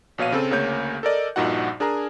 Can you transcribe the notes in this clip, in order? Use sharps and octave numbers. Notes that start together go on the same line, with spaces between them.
A#1 B2 C#5 F5 D#7
C#3 C4 A4
D2 C#3 A#3 C#5 G6
A4 A#4 D5 D#5
A#1 G2 A#2 D#4 F#4 F#5
D4 G#4 A#4 G#5 A#5